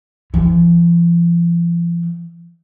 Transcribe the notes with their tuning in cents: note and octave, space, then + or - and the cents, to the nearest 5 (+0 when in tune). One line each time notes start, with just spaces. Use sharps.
F3 -40